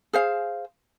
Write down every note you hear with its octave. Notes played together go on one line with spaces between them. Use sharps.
G#4 C5 F5